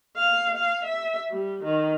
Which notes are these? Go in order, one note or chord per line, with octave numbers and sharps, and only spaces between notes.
F5
F5
E5
G3
D#3